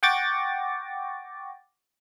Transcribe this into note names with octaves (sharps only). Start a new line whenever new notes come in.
F#5 G5 C#6 D6 A6 A#6